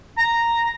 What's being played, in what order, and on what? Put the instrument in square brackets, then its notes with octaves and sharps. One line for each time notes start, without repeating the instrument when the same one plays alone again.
[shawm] A#5